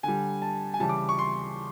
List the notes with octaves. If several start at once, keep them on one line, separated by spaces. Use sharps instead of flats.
D3 G3 G#5
A5
G#5
C#3 E3 G3 A5
D6
C#6
C6